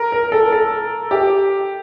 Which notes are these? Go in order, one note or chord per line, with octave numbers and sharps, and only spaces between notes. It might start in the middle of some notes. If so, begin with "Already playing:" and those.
Already playing: A#4
A#4
A4
A4
G4